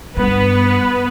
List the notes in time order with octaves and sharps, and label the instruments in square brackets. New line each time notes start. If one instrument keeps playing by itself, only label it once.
[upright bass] G2 [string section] B3 B4